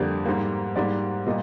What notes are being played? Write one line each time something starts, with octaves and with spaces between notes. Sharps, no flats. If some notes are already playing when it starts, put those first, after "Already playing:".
Already playing: F2 D3 G3 A#3 D5
G#2 G3 A#3
G#2 G3 A#3 D5
A#2 G3 A#3 D#5